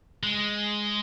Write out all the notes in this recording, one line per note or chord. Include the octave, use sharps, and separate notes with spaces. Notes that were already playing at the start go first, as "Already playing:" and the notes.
G#3